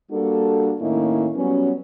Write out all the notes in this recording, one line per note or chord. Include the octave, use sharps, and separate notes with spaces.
G3 A#3 D4 F#4 A4
A2 D#3 A#3 C#4 D#4 E4
F#3 G3 B3 C#4